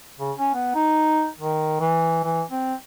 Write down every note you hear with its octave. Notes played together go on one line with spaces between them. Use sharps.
C#3
C#4
B3
D#4
D#3
E3
E3
C4